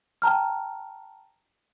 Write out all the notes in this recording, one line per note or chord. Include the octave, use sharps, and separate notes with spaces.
G5 A5 A#5 F6